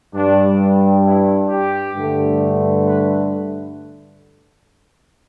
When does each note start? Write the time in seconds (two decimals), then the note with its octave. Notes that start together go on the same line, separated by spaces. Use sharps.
0.14 G2 G3 D4
1.05 E4
1.49 G4
1.95 G2 D3 A3
2.86 B4